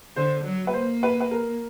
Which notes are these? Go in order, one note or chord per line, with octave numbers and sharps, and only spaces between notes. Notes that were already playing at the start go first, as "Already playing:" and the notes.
D3 C5
F#3
B4
A#3 C5
B4
B4
A#4